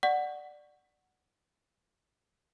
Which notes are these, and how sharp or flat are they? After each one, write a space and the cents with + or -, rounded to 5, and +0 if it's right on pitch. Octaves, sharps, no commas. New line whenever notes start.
D5 +15 F#5 +0 C#6 +0